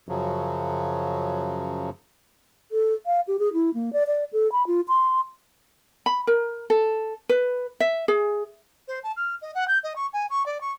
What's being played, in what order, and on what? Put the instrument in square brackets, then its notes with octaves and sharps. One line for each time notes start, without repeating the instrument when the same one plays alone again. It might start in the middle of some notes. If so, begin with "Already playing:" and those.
[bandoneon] F#2 C#3 F3 F#3
[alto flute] A4
F5
G4
G#4
E4
A#3
D5
D5
A4
B5
F4
C6
[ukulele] B5
A#4
A4
B4
E5
G#4
[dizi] C5
A5
F6
D#5
F#5
G6
D#5
C#6
G#5
C#6
D5
C#6